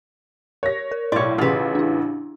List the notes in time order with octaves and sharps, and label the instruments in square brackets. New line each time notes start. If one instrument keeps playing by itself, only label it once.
[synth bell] A#4 [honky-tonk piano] C#5 A#6
[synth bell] A#4
[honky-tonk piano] B1 A2 [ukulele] C#5 D5 [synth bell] C6
[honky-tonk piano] A1 C#3 [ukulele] F4 B4
[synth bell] D4 E4